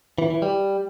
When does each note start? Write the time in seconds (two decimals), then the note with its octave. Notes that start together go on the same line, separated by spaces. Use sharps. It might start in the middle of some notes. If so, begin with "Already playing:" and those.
0.18 E3
0.30 E3
0.42 G3